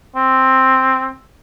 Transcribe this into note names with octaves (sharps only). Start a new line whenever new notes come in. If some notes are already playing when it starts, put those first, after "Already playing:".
C4